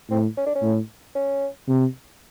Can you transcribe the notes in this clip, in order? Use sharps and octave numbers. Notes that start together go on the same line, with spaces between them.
A2 C4
C#4
D4
C#4
A2
C#4
C3